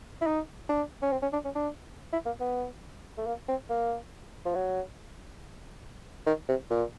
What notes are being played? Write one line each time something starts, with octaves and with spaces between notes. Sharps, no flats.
E4
D#4
D4
C#4
C4
C#4
D4
C#4
D4
E4
A#3
B3
A3
A#3
C4
A#3
F3
F#3
D#3
C3
A#2